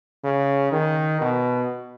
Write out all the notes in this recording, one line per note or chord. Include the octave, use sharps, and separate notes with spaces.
C#3
D#3
B2